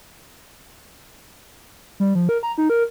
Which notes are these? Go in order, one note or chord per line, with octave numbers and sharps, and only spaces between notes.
G3
F3
A#4
A#5
D#4
A#4